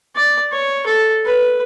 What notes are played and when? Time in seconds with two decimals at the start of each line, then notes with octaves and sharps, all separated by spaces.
0.16 D5
0.52 C#5
0.86 A4
1.25 B4